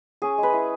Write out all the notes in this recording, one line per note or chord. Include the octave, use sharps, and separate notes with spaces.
C#4 G#4
G#3
B4
E4